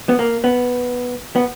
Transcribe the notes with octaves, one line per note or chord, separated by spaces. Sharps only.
B3
A#3
B3
B3